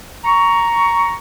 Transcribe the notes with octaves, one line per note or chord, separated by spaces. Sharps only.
A#5 C#6